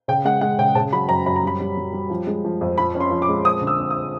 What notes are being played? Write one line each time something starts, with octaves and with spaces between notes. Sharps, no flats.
C#3 G5
G#3 F#5
G#3 F#5
C#3 G5
C#3 A5
F#3 B5
F#2 A#5
F#2 B5
A#5
G3 B5
G3
G3
G3
F3
G#3
F3
F2
F3 B5
C#4
C6
F3
D6
G#3
C4 D#6
D3
E6
C4
D#6